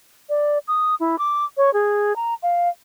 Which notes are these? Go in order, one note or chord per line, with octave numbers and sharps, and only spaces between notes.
D5
D#6
E4
D6
C#5
G#4
A#5
F5